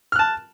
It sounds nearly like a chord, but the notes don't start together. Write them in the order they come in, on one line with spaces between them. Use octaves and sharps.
F6 F#6 A5